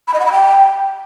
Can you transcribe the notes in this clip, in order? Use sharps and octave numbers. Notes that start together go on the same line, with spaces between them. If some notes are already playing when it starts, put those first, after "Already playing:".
B5
D#5
F#5
B5
G5